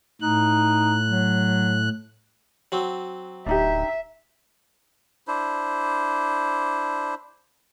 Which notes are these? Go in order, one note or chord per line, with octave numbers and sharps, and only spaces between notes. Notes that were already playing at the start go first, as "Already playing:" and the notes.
A2 D#4 F#6
F#3
F#3 C4
D1 D4 D#4 G4 E5
D4 E4 C5